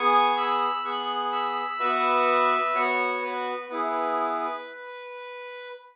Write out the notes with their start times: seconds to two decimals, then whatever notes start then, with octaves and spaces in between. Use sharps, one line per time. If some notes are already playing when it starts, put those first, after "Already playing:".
Already playing: B3 G#4 G#5 C#6
0.37 B5 E6
0.85 B3 G#4 C#6 F#6
1.32 B5 E6
1.79 B3 F#4 B4 E5
2.75 B3 F#4 C#5
3.22 B4
3.69 B3 E4 G#4 B4